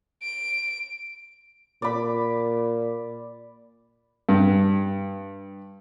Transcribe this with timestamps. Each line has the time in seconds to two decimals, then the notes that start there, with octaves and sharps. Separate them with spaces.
0.23 D7
1.82 A#2 D5 B5
4.29 G2